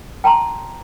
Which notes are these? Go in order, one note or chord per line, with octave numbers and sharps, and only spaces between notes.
G5 A5 A#5 C6